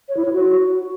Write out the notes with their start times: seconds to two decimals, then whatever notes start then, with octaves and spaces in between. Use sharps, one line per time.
0.09 C#5
0.17 E4
0.25 C#5
0.33 F#4